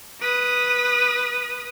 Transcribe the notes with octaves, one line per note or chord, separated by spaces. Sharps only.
B4 D#6